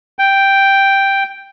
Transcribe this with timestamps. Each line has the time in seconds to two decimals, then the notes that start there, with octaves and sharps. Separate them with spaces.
0.19 G5